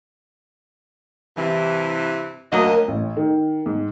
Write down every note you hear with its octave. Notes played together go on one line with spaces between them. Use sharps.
G2 C3 E3
D2 F#3 A#3 D#5
A1
D#3
G#2